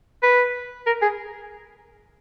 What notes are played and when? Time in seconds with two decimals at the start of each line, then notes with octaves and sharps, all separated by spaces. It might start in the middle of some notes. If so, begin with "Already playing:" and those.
0.23 B4
0.87 A#4
1.02 G#4